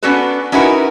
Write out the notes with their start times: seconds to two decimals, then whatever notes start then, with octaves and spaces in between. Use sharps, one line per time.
0.03 B3 C#4 D4 F#4 A4 B4
0.52 C#4 D#4 E4 F#4 A#4 B4